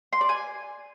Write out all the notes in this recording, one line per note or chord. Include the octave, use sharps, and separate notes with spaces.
C6
D5
G#5